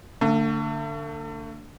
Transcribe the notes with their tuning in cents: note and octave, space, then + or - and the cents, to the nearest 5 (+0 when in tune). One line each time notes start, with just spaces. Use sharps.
D3 +0 A3 +40